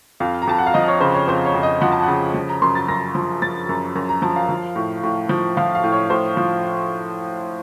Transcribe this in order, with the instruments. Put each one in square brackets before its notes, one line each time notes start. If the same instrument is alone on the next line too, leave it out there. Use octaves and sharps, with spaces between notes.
[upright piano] F2 F5
A#5
F2 A5
F#5
F5
F3 D#5
C#5
C#3 C5
C#5
F2 C5
C#5
F2
D#5
F3 F#5
A5
C#3 F#5
F3
A#5
F#2 C6
A6
F#2 A#6
F3
F3 A6
F#2
F#2 A#5
A#5
F3 A5
F5
F3
A2
A2
F3
F3 F5
F5
A2
C#5
A2 C5
F3